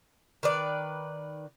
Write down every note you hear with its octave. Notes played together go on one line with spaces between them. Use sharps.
D#3 B4 D5